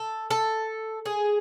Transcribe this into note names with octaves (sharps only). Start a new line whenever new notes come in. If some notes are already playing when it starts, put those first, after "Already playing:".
Already playing: A4
A4
G#4